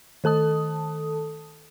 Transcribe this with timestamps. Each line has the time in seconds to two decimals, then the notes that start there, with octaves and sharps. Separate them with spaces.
0.24 D#3 A4 A5 D#6